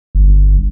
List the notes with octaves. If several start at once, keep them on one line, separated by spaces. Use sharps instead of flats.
G1